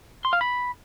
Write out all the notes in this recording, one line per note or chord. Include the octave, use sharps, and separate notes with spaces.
C6
F5
B5